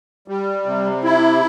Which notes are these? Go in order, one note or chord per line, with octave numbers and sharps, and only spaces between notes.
G3
C3
E4